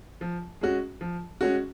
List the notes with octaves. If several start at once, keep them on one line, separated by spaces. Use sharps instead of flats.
F3
G#3 C#4 F#4
F3
G#3 C#4 F#4